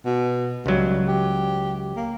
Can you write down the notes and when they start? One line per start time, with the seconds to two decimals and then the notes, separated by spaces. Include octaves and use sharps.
0.05 B2
0.66 C#2 F#3 G3
1.08 G4
1.96 A#3